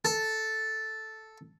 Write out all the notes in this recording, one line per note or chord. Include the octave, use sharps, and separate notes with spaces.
A4